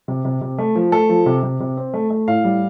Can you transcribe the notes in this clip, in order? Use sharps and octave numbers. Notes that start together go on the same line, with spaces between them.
C3
C3
C3
A3
F3
A3 A4
F3
C3
C3
C3
C4
A3
A3
A2 F5
G3